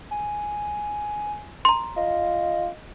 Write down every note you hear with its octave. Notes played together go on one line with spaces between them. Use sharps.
G#5
A#5 C6
F4 D#5